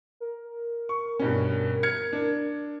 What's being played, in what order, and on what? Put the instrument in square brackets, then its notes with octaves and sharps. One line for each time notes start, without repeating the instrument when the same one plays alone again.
[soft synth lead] A#4
[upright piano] C#6
G2 B2 C#4
F6 G#6 C#7
D4